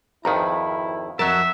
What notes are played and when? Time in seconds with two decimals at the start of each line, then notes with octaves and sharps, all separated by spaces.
0.25 G#1 F2 D#3 E4 B4 A#5
1.19 F2 F#3 A#4 E5 F#5 A5